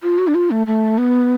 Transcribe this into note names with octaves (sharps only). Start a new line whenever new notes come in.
F4
F#4
D4
F4
A3
A3
B3